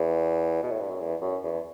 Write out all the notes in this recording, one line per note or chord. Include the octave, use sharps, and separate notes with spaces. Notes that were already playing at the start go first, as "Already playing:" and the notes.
Already playing: E2
B2
A2
G2
F#2
E2
F#2
E2